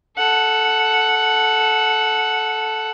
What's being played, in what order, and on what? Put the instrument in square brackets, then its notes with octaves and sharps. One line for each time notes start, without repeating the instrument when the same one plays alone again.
[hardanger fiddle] A4 F#5